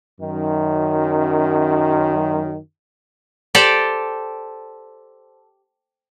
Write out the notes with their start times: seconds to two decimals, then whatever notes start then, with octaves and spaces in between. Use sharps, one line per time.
0.21 F#2 D#3
3.55 G4 A4 C5 D5